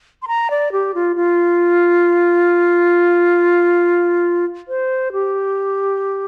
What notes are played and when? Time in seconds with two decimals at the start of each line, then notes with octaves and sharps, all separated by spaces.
0.22 C6
0.28 A#5
0.50 D5
0.72 G4
0.94 F4
1.16 F4
4.68 C5
5.12 G4